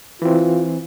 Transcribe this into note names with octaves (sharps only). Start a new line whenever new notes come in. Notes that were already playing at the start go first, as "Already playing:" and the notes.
E3 C4 F4